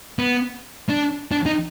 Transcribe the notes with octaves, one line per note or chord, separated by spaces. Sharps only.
B3
D4
D4
D#4